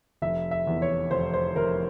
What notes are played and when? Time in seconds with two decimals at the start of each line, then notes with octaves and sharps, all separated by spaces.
0.22 F1 E5
0.51 E5
0.67 E2
0.82 C#5
1.11 F1 C5
1.34 C5
1.56 F1 A#4